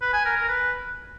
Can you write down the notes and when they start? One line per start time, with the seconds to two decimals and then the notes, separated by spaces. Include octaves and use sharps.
0.01 B4
0.13 G#5
0.25 A#4
0.37 A#4
0.48 B4